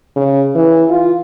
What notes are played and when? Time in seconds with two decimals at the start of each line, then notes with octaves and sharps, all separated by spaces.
0.16 C#3
0.55 E3
0.89 F4